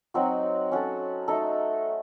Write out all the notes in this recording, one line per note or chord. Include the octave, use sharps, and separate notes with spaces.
F#3 C4 D#4 F#4
C#4 F#4 A4
A3 D#4 A4